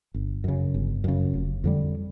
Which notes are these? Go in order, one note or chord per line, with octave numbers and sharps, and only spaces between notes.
G1
F#2 C#3
G1
F#2 C#3
F1
F2 D3 G3